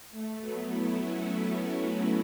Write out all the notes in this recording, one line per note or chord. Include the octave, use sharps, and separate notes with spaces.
A3
F#3 B3
B3 E4
C#4 F#4